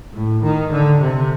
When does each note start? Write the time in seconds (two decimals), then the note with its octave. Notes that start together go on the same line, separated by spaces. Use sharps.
0.14 A2
0.42 D#3
0.71 D3
1.00 C3